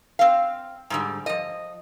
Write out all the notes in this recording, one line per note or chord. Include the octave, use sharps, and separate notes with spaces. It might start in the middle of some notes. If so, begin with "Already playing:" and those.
C4 F5
G#2 D3 G3
F3 D#5